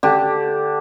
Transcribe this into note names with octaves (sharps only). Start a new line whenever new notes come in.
D3 G4